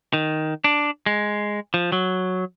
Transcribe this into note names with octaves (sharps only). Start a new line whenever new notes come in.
D#3
D4
G#3
F3
F#3